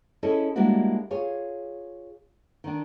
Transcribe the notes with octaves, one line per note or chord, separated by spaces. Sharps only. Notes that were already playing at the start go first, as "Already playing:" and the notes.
C#4 E4 G#4 A4 C#5 D#5
G3 G#3 A#3 D4 E4 F#4
F4 G#4 C#5
D#3 D4